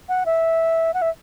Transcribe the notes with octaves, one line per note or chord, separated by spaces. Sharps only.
F#5
E5
F#5
E5